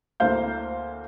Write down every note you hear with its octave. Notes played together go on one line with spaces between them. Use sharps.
D2 A#3 E4 C5 F5 G6